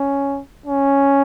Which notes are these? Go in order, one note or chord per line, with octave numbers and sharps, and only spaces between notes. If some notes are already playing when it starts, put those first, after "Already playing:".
Already playing: C#4
C#4